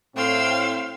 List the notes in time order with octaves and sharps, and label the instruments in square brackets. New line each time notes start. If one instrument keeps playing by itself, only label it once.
[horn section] A2 [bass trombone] C4 [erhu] F5 [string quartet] G5 C6 E6